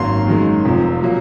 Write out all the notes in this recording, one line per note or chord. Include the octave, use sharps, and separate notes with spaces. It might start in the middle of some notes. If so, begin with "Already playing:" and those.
Already playing: G#1 F#2 D#3 A#3 C6
F#2 D#3 G#3
F1 F2 C3 F3
A#2 F#3 A#3